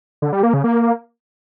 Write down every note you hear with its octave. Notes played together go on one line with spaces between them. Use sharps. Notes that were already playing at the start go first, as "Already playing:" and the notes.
D3
G3
A#3
C#3
A#3